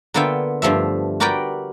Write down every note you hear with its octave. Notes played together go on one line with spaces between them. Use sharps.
D3 A#3 B3 F4 E5 G5
G2 F3 A3 E5
F#4 G4 A#4 B4 D5 G5